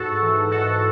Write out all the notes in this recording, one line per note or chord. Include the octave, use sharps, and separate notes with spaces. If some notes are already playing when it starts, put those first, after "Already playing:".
Already playing: G#2 F#4 A4
E3
G#2 F#4 A4